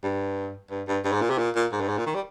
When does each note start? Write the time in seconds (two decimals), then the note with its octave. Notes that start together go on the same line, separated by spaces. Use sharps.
0.03 G2
0.70 G2
0.88 G2
1.04 G2
1.12 G#2
1.21 A#2
1.30 C3
1.38 A#2
1.55 A#2
1.72 G#2
1.81 G2
1.89 G#2
1.98 A#2
2.06 D#3
2.15 G3